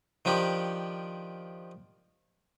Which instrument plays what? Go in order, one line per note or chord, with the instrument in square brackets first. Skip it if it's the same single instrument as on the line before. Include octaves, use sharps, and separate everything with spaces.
[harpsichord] D#3 F3 D4 G4